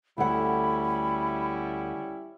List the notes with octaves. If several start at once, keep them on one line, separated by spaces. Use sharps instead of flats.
D2 G3 C#4 E4 F#5 B5